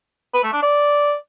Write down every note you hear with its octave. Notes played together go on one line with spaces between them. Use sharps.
B4
A3
D4
D5